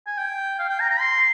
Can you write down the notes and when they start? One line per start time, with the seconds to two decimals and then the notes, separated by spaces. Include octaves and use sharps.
0.07 G#5
0.17 G5
0.59 F5
0.69 G5
0.80 A#5
0.90 A#5
1.00 C6